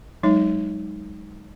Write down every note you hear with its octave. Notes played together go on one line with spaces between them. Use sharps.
F#3 G#3 D#4 C#5